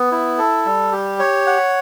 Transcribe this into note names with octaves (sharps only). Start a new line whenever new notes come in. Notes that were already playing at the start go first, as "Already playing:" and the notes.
Already playing: B3
E4
A4
G3
G4
C#5
F#5